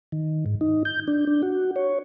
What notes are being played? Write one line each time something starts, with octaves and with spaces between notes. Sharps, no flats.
D#3
G#2
D#4
G6
D4
D4
F#4
C#5